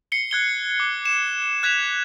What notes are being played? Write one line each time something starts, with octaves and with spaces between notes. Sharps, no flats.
C7 C#7 G7
F#6 G#6 G7
D6
E7
F#6 G#6 B6 E7 F7